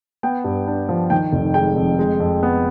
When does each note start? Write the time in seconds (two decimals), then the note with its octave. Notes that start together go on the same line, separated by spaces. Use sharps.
0.23 B3 G5
0.44 G2
0.67 D4
0.89 F3
1.10 D#3 G5
1.33 F1
1.54 G#3 G5
1.76 F2
1.99 G#3
2.20 F2
2.43 B3